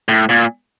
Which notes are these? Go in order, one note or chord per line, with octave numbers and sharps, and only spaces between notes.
A2
A#2